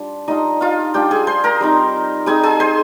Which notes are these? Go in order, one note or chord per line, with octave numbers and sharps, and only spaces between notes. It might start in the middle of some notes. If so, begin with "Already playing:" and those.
Already playing: G3 D4 F4
G3 D4 D#4 F4 D#5
F4 F5
G3 D4 F4 G4 G5
G#4 G#5
C5 C6
A#4 A#5
G3 C4 D#4
G3 C4 D#4 G#4 G#5
G#4 G#5
C5 C6